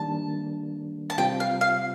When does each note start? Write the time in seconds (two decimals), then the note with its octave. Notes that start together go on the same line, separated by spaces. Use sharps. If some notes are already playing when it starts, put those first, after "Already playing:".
Already playing: D#3 G3 A#3 D4 A5
1.10 A5
1.18 C3 G3 C4 F4 G5
1.40 F5
1.61 F5